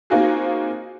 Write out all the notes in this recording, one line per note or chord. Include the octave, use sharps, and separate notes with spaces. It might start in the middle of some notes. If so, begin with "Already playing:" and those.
A#3 C4 D#4 F4 F#4 G#4